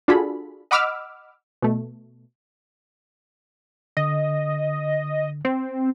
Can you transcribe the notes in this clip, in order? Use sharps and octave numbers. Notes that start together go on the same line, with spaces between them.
D4 F4 F#4 G#4 A4 B5
D#5 F#5 B5 D6 E6 F6
B2 A3
D3 D#5
C4